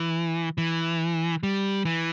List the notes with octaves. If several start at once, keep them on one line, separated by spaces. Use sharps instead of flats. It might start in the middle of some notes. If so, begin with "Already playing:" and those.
Already playing: E3
E3
G3
E3